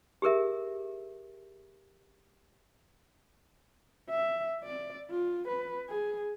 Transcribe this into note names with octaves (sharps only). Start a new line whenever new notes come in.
G4 G#4 A#4 E5
E5
D5
F4
B4
G#4